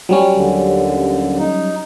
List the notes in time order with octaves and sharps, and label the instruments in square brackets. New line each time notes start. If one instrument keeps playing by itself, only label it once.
[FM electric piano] F#3 G3 C#4
[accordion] D#2 D3
D#4